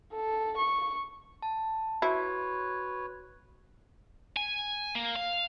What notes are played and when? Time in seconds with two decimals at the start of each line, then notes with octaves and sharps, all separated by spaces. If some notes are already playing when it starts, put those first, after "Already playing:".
0.13 A4
0.57 C#6
1.42 A5
2.02 E4 F#4 B4 C#5
4.36 G#5
4.95 A#3
5.16 F5